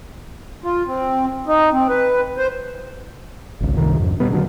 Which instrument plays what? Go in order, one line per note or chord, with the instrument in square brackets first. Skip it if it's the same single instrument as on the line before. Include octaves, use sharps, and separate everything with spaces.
[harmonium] F4
C4
D#4
C4
B4
C5
[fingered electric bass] G#1 C#2
C2 G2 C3 D#3
F2 G#2
B2 G3 B3
D3 F#3 D4